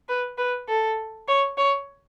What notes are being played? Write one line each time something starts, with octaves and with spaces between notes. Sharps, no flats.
B4
B4
A4
C#5
C#5